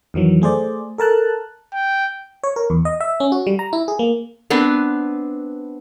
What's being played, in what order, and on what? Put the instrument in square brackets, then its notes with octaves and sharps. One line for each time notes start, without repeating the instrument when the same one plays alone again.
[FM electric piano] F2 D#3 E3 F#3
A3 G#4 C5 D5
A4 A#4 A5 F#6
[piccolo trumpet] G5
[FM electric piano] C#5
A#4
E2
D#5
E5
C#4
F#4
G3
A#5
E4
G#4
A#3
[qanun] B3 C4 D4 B4